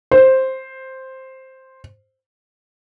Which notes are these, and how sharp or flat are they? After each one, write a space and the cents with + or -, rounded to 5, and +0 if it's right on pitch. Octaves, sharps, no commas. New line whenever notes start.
C5 +5